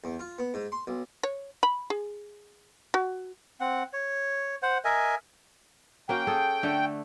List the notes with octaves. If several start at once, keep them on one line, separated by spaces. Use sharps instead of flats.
E2
F4
B3
G#2
C6
B1
C#5
B5
G#4
F#4
C4 F#5
C#5
C5 F#5
A#4 D#5 E5 G#5
A#3 C#4 F#4 G5
G#4 A4
D3 A3